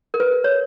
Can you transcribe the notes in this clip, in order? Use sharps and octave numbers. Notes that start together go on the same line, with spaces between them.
A#4
B4
C#5